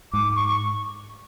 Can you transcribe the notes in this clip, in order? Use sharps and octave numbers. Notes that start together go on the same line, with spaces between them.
G#2 D6
C#6
C#6